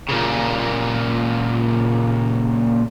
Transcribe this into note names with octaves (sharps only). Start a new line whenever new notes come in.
A#2 C#3